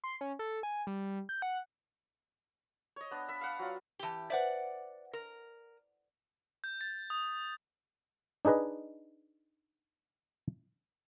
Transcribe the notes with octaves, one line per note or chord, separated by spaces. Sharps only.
C6
C#4
A4
G#5
G3
G6
F#5
C#5 D#5
B3 D4
E5 B5
F5 F#5
F#3 F4
E3 G4 A5 G7
B4 C5 D5 E5 F#5
A#4
G6
A6
D#6
D4 D#4 G#4 B4 D#5